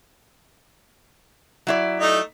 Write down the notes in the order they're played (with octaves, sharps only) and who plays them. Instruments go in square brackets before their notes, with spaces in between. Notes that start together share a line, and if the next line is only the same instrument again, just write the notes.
[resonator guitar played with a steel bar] F#3 E4 D5
[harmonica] A3 D#4